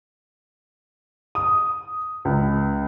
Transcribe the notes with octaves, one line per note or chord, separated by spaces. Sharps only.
D#6
C#2